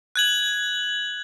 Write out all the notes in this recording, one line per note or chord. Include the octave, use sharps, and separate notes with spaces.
F#6 G#6 F#7